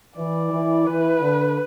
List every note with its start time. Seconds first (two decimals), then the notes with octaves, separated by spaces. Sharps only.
0.17 E3 D5
0.51 E3
0.86 E3 B4
1.21 D3